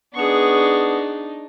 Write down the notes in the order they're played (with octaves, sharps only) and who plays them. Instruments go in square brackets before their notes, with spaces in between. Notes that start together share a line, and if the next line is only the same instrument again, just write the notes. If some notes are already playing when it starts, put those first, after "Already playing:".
[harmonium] B3 [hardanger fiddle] D4 D#4 [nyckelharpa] G#4 C#6